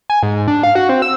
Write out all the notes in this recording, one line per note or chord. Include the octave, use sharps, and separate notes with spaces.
G#5
G#2
D4
F5
F#4
C4
E6